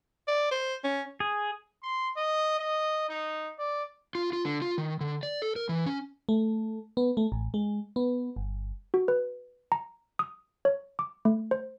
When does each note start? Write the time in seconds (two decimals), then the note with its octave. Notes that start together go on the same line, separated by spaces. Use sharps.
0.28 D5
0.52 C5
0.84 C#4
1.20 G#4
1.83 C6
2.17 D#5
2.59 D#5
3.09 D#4
3.59 D5
4.15 F4
4.33 F4
4.45 D3
4.62 F4
4.78 D#3
5.01 D3
5.23 D5
5.42 A4
5.56 A#4
5.69 E3
5.86 C#4
6.29 A3
6.97 B3
7.17 A3
7.32 A1
7.54 G#3
7.96 B3
8.36 G1
8.94 F#4
9.08 B4
9.72 A#5
10.19 D#6
10.65 C#5
10.99 D6
11.25 A3
11.51 C5